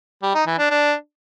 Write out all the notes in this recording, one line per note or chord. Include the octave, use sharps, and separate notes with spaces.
G3
D#4
E3
D4
D4